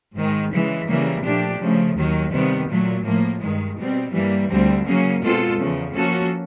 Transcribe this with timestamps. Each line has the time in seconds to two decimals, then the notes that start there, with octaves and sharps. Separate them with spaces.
0.15 G#2 D#3 G#3
0.51 C#3 E3 G#3
0.88 C#3 E3 G3 A#3
1.23 A#2 F3 A3 D4 G4
1.60 C#3 F3 A3
1.96 D#2 D#3 F#3
2.32 C3 D#3 G3 B3
2.69 A#2 F#3 A3
3.05 A2 F3 A#3
3.41 G2 D#3 G#3
3.77 B2 G3 C4
4.13 G2 E3 G3 A#3
4.49 D2 D3 G3 C4
4.86 C#3 F#3 A#3 C#4
5.21 B2 G#3 C4 F4 A4
5.57 E2 C#3 F3
5.94 F3 A#3 C#4 F#4 A4